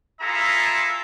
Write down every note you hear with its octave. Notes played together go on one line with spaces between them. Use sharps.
E4 F4 G#4 A4 E5 A#5